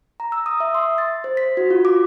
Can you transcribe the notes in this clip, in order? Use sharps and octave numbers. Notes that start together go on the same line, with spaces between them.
A#5
E6
D#6
E5
C6
A6
C5
B6
F#4
F4
D6